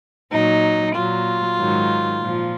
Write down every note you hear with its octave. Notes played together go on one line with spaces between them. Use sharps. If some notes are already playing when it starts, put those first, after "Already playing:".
A#2 F#3 D#4
A#2 F#3 F4
G#2 D#3 F#3
A#2 F3